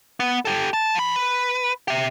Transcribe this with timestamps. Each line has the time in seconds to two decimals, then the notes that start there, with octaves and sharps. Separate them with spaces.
0.20 B3
0.45 G4 A4
0.73 A5
0.95 F3 B5
1.16 B4
1.88 G4 E5